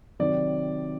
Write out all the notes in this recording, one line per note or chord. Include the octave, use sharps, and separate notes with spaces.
C3 D#3 F#3 D5